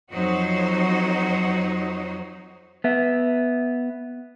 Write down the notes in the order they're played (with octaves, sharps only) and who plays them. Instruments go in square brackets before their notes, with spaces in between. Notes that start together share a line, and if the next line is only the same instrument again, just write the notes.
[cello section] F2 F#3 D#4 F#4 C5 C#5
[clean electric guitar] B3 E5